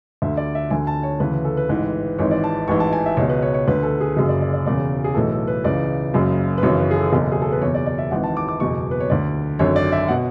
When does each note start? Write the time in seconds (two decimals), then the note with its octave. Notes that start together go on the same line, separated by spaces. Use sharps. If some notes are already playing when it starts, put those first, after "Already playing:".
0.22 D2 D3 E5
0.37 D5
0.55 E5
0.71 D2 D3 G#5
0.87 A5
1.03 C#5
1.20 D2 C#3 E3 B4
1.45 A4
1.57 B4
1.69 A1 G#2 E3
2.18 G#1 G#2 E3 C#5
2.31 D5
2.44 A5
2.68 A1 G#2 E3 C#6
2.80 A5
2.93 G#5
3.06 E5
3.17 C#2 B2 C#5
3.29 B4
3.42 C#5
3.54 C#5
3.68 D2 D3 B4
3.83 A4
4.01 G#4
4.16 F#1 F#2 C#3 G#4
4.29 D5
4.41 D5
4.53 D5
4.66 E1 E2 C#3 D5
5.04 G#4
5.15 B1 A2 E3 A4
5.32 A4
5.47 B4
5.64 C#2 C#3 E3 D5
6.14 F#1 F#2 C#3
6.58 B4
6.63 G#1 F#2 C#3 E3 C#5
6.79 B4
6.91 G#4
6.96 A4
7.13 F#1 E2 B2
7.32 G#4
7.42 A4
7.52 B4
7.62 F#1 E2 B2 C#5
7.75 D5
7.86 D5
7.98 E5
8.11 G#1 G#2 E3 F#5
8.23 A5
8.37 D6
8.48 D6
8.60 F#1 E2 B2 C#6
8.91 B4
9.00 C#5
9.10 D2 D3 D5
9.59 G#1 F#2 D3 C#5
9.76 D5
9.92 E5
10.08 B2 F#5